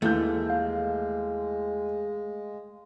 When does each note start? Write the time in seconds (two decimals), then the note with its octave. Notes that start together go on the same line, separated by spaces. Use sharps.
0.02 D#2 E3 G#3 A3 G6
0.50 F5